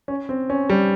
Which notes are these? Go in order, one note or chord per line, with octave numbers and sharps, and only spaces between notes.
C#4
C4
C#4
G3